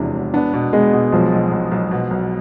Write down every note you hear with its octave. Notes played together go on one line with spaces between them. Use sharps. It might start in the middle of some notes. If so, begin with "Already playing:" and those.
Already playing: E1 E2 C3 F3 D4 E4
E1
B3 D4
B2
G#3 B3
B2
B1 F3
B1
B1
B1
B2
B1